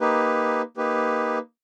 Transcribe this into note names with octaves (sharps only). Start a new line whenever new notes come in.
A#3 D#4 G4 B4
A#3 D#4 G4 B4